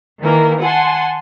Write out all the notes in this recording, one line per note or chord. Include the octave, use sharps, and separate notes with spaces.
D#3 E3 A#3 A#4
F#5 G#5 A5 C6